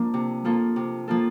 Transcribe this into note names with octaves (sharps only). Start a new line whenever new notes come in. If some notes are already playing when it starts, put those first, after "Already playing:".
Already playing: F3 A#3 D4
C3
F3 A#3 F4 A4
C3
F3 A#3 F4 A4